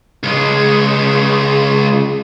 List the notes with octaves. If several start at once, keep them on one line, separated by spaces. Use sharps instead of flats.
C#2 G#3